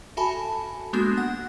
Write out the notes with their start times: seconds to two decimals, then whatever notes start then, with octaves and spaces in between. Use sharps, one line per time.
0.17 F#4 A4 E5 G#5 A5 B5
0.93 G#3 A#3 B3 D4 F#4 G6
1.17 F#5 F#6